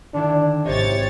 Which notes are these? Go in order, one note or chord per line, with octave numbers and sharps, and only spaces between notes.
D3 D#3 D4 E4
G#1 C3 E4 C5 C#5 D#5 A6